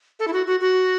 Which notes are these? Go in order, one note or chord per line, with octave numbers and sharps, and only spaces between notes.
A4
E4
F#4
F#4
F#4